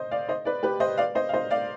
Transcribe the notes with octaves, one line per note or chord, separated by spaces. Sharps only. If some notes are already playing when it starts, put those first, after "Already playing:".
Already playing: C5 D#5
D5 F5
C5 D#5
B4 D5
G4 B4
C5 D#5
D5 F5
C5 D#5
F5
C5 D#5
D5 F5